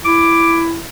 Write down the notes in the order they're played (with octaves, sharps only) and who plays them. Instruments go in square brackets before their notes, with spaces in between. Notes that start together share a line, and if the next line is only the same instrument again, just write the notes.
[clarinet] E4 [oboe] D6